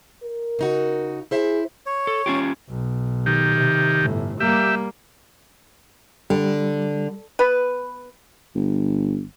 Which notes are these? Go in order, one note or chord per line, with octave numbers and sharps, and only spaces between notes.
A#4
C#3 D#4 F#4
E4 G#4 C5 E5
C#5
A4
C#4 F4 G4
B1
D#3 G4
C3
G1 A2
G3 A#3 G4 E5
D3 G3
B3 B4
G1